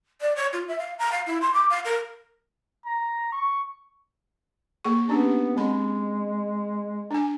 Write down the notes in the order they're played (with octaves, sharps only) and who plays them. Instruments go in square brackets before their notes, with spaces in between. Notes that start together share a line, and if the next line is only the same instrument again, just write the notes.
[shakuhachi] D5
C#5
F4
E5
F5
A#5
F5
E4
C6
D6
F5
A#4
[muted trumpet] A#5
C#6
[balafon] A#3 G#4 C#6
[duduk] B3 [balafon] C#4 D4 G4
[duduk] G#3 [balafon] C4 B5
[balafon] D4 G#5